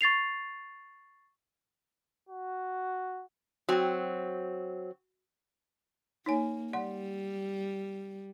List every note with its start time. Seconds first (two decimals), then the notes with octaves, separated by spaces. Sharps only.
0.01 C#6 A6 C7 F7
2.29 F#4
3.69 F#3 C4 F#4 G5
6.26 A#3 D#4 C#5 G#5
6.73 G3 D5 F#5 C6